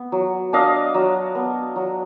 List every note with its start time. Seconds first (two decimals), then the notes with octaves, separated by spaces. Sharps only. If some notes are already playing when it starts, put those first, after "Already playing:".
Already playing: B3
0.12 F#3
0.53 D4 D#5 F5
0.94 F#3
1.35 B3
1.76 F#3